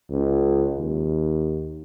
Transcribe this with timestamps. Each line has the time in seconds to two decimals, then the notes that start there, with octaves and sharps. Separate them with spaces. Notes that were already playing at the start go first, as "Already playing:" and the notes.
0.11 C#2
0.77 D#2